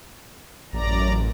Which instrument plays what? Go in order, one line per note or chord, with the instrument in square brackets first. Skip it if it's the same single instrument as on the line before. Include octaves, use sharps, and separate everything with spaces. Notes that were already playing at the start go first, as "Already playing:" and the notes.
[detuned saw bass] A1 [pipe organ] F#2 D5 A#5